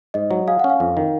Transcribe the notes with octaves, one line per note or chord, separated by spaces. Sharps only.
G#2 D#5
F#3
G#4 F5
C#4 F#5
F5
F2
D#3